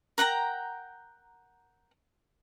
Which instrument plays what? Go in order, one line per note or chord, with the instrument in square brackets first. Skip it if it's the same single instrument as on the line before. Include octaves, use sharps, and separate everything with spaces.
[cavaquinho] A#4 F#5 G5 A#5